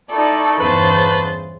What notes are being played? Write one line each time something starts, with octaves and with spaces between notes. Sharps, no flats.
D#4 E4 A4 D5 A5 C#6
G1 E2 C#3 B4 C5 A6